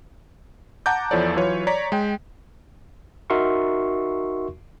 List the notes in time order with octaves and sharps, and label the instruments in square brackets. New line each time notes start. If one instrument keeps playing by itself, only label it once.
[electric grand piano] F#5 A5 A#5 D6 G6
E2 F3 E4 A4 C#5 D5
E3 F#3 F4 B4 C#5
C#5 D5 A#5 B6
G#3 G5
[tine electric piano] D#4 F#4 A#4 E5 C6 C#6